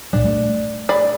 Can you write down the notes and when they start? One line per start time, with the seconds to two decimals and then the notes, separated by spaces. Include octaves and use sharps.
0.13 C2 A#2 G3 D4
0.25 A3
0.89 G#4 D5 B5